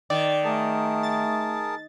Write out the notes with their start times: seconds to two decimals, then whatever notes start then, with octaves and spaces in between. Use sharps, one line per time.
0.10 D#3 D5
0.44 A3 G#4 A#4 A5
1.03 A6